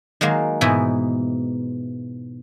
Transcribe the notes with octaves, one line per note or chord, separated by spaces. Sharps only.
D#3 F#3 G#3 A#3
G#2 B2 E3 D#4 E4